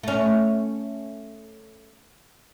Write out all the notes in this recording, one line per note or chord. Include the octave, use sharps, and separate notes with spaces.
A3 C#4